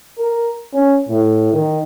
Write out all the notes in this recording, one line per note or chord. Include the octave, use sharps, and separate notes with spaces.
A#4
C#4
A2
D#3